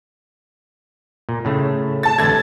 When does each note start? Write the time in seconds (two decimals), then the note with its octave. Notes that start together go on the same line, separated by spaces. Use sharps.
1.29 A#2
1.45 A2 C#3 A3
2.03 A5 A6
2.18 A1 D3 A3 G#6 A6